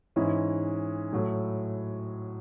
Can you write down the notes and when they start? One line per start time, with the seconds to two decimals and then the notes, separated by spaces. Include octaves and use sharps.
0.16 G#2 E3 G#3 C#4 E4
1.13 A2 F#3 A3